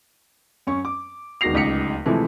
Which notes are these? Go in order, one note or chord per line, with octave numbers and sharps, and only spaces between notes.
F#2 C#4 C#6
D6
E1 D#3 F#4 A#6 C7 F7
D1 C#2 D#4 B6 C#7 F7
C3 E3 F3 G#3 A3